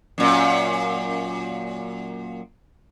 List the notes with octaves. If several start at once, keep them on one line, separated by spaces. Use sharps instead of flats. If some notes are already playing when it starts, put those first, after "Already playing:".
F#2 A#2